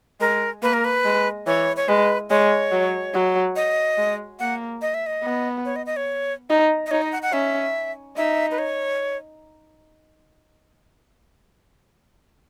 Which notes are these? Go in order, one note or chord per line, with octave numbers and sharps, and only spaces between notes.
G#3 A#4
A#3 B4
A#4
B4
G#3
E3 C#5
C#5
G#3 B4
G#3 C#5
F#3
F#3
D#5
G#3
A#3 F#5
D#5
E5
D#5
B3
C#5
D#5
D#5
C#5
D#4
D#5
D#4 C#5
D#5
F#5
F#5
C#4 E5
D#4 E5
B4
C#5